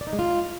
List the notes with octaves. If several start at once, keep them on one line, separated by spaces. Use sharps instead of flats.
D5
D#4
G#3
F4